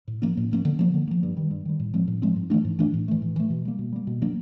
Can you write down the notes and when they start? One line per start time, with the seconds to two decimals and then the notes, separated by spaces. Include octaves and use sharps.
0.08 A2
0.22 F3 A#3 C#4
0.37 A2
0.51 F3 A#3 C#4
0.65 D3
0.79 F3 A#3
0.94 D3
1.08 F3 A#3
1.23 G2
1.37 D#3 G3
1.51 G2
1.65 D#3 G3
1.80 A2
1.94 F3 G#3 C4
2.08 A2
2.22 F3 G#3 C4
2.36 G#2
2.50 E3 A3 D4
2.65 G#2
2.79 E3 A3 D4
2.94 A2
3.08 E3 A3
3.22 A2
3.36 E3 A3
3.50 B2
3.65 G3 A#3
3.79 B2
3.93 G3 A#3
4.07 B2
4.22 F#3 A#3 D4